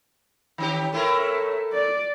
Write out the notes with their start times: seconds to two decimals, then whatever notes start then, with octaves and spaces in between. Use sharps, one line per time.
0.58 D#3 C#4 G4
0.93 A3 E4 A#4 C#5 E5
1.73 D5